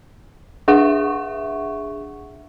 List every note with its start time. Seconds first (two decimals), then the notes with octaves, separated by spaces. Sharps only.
0.68 D4 G#4 E5 F#5 C#6